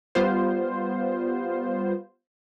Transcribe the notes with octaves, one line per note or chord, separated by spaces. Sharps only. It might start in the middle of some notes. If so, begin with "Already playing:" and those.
G3 B3 F4 C5